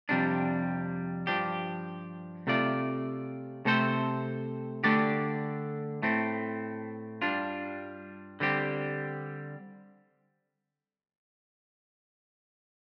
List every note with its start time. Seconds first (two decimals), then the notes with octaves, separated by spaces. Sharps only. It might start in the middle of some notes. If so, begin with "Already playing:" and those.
0.09 F2 C3 G3 D4
1.27 G2 F3 D4 G4
2.47 C3 A3 F4 D5
3.65 C3 A3 C4 A4 C5
4.84 D3 A3 D4 G4 D5
6.02 A2 A3 C4
7.22 G2 G3 D4 F4
8.40 D3 G3 C4 G4